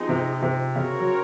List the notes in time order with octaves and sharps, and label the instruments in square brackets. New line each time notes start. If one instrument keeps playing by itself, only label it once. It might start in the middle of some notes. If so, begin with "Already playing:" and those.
Already playing: [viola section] F3 C4 D#4 G#4
[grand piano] C3
C3
[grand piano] C#3 [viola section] C4 F#4 A#4 C#5
[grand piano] F#3